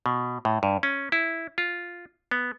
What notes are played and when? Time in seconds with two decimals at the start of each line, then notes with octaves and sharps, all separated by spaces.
0.06 B2
0.45 A2
0.63 G2
0.83 C#4
1.12 E4
1.58 F4
2.31 B3